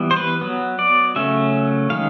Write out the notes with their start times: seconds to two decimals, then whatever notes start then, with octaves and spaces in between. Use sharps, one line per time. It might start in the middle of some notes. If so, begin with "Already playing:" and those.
Already playing: E3 G3 B3
0.11 C5
0.16 B4
0.41 F#3 B3
0.79 D5
1.16 C#3 F#3 A3 C#4 E5
1.90 D#3 G#3 C#4 F5